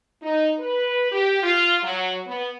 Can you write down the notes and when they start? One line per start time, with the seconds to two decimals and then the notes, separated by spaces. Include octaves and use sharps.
0.22 D#4
0.59 B4
1.11 G4
1.42 F4
1.82 F#3
2.26 B3